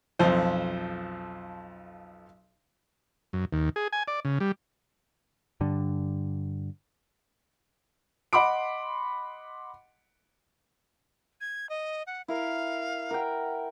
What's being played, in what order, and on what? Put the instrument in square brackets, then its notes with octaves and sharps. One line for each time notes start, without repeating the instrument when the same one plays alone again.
[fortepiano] B1 F2 F3 C5
[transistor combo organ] F#2
D#2
G#4
G#5
D5
C#3
G3
[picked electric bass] G2 D3
[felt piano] D#5 F#5 B5 C6 D6 D7
[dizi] G#6
D#5
F#5
[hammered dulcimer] E4 A#4 [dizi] F5
[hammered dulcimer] A#4 F#5 G5